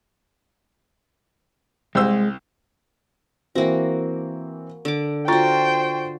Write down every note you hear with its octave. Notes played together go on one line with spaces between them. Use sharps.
C2 G#3 C5 E6
E3 A#3 C4 F#4
D3 D6
F4 F#4 C5 G5 A#5 C#6 A6